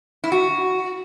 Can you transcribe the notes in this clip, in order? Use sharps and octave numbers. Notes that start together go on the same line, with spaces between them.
E4
F#4